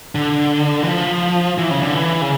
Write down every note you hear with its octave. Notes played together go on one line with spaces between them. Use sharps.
D3
E3
F3
E3
C#3
D3
E3
C#3